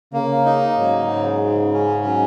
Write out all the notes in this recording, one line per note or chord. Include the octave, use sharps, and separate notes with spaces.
C#3 A#3
D#4
G#2 F#3
C#3
C#3
C#4
F#3